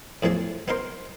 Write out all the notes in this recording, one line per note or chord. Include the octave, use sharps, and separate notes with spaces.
E2 A2 F3 G#4 D5
B3 D#4 A#4 C5